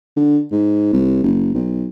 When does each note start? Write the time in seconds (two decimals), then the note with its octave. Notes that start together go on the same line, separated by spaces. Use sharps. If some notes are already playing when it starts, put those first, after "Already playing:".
0.17 D3
0.52 G#2
0.93 C2
1.24 F#1
1.54 B1